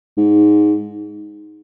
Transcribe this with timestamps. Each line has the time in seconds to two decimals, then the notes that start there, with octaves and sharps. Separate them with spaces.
0.18 G#2